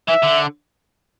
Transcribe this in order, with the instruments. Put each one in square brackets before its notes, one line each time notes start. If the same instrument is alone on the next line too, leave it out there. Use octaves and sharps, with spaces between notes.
[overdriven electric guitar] E3 [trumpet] E5
[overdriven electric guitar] D3